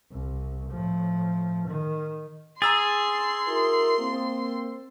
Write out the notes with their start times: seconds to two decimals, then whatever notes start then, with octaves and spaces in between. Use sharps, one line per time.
0.12 C2
0.70 A2 F3
1.68 D#3
2.62 G#4 A#5 C6 E6 A6
3.48 E4 F#4 A#4
3.99 A#3 C4